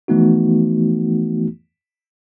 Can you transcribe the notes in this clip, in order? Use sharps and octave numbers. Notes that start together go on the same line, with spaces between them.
E3 F3 A3 B3 D#4 F#4